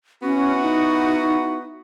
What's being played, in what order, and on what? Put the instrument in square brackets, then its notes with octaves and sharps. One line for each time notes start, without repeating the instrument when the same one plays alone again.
[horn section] B3 E4 F#4 [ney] C#4
[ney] D#4